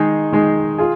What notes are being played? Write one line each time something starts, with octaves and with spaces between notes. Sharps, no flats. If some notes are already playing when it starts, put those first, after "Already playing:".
Already playing: D#3 G#3 D#4 G#4
D#3 G#3 D#4 G#4
F4 G#4